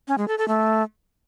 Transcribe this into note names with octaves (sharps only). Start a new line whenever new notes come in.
C#4
G#3
A4
A4
A3